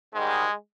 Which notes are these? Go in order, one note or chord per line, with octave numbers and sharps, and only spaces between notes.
G#2 D#3 G3 G#3